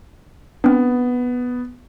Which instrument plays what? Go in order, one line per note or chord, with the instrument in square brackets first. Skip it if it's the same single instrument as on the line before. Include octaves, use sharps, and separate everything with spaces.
[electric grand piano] B3 [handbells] C4 D4